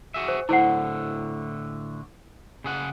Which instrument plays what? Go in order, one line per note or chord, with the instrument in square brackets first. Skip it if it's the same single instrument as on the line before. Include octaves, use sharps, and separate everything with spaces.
[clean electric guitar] F#4 G#4 E5
[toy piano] C5
[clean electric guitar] A2 D3 [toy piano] E4 C5 F#5
[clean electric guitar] C#3 G#4 F#5